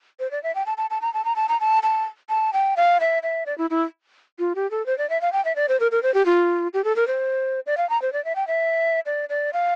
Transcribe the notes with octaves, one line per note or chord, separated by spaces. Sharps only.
C5
D5
E5
G5
A5
A5
A5
A#5
A5
A#5
A5
A#5
A5
A5
A5
G5
F5
E5
E5
D5
E4
E4
F4
G4
A4
C5
D5
E5
F5
G5
E5
D5
C5
A#4
A#4
C5
G4
F4
G4
A4
A#4
C5
D5
F5
A#5
C5
D5
E5
G5
E5
D5
D5
F5